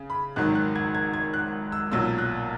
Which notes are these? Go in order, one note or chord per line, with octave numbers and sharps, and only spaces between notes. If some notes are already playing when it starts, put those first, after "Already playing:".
Already playing: C#3
B5
G#1 G#2 D#3 F#3 F#6
F#6
G#6
G#6
G#6
F#6
E6
B1 A#2 F#3 E6
F#6